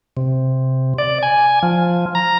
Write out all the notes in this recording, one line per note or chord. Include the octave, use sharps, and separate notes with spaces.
C3
D5
G#5
F3
A#5